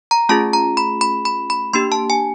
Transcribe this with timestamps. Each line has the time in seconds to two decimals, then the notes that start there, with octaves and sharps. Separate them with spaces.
0.11 A#5
0.29 A3 C#4 F4 G#4 A5
0.53 A#5
0.77 B5
1.01 B5
1.25 B5
1.50 B5
1.73 A#3 D4 G4 C6
1.92 A5
2.10 G#5